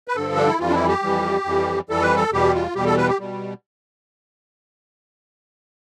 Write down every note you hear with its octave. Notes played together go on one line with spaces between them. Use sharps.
B4
G2 D3 F3 A4
D4
E4
F2 E3 G3 F4
D4
E4
G4
F2 E3 G3
F2 E3 G3
F2 E3 G3 A4
B4
A4
E2 B2 G3 G4
F4
E2 B2 G3 G4
A4
B4
G4
B2 G3